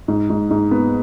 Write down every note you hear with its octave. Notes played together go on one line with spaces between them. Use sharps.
G#2
G#2
G#2
B3